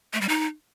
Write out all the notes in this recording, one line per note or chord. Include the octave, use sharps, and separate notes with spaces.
A3
G3
D#4